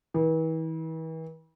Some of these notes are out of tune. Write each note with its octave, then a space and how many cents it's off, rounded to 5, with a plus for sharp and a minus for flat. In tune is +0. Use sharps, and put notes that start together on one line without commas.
E3 -40